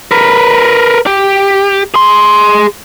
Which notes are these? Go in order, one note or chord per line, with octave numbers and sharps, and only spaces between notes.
A#4 B4
G4
G#4 C6